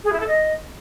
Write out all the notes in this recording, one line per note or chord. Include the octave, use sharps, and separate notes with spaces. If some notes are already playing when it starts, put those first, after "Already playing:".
G#4
E4
A4
D#5